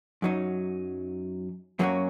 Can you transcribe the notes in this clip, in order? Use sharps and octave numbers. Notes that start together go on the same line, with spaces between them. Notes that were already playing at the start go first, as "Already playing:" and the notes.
F#2 F#3 D#4
F#2 F#3 A#3 C#4 F#4